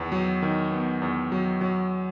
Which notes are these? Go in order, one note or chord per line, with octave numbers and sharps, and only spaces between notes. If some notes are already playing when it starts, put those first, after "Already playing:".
Already playing: E2 D#3 B3
F#3
D#3
B3
E2
F#3
F#3